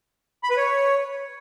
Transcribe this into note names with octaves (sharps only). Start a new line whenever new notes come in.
B5
B4
C#5